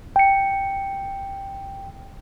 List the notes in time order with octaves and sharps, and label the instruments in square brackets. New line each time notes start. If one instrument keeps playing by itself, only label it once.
[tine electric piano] G5 C#7